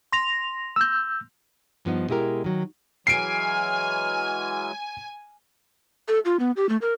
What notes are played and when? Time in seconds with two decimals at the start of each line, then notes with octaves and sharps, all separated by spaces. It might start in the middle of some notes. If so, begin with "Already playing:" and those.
0.12 C6 A#6 F7
0.76 E6 G6
1.85 G2 F3 B3 D#4
2.09 B2 G#3 E4 G4 A#4
2.44 D#3 F#3
3.07 E3 F#3 G#3 G#5 F6 C7 D7
6.08 A4
6.25 F4
6.40 B3
6.57 G4
6.69 A3
6.82 A#4